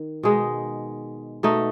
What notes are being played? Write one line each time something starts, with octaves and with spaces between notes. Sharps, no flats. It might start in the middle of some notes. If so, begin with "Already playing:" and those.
Already playing: D#3 D#4
B2 G#3 D#4
B2 A3 D#4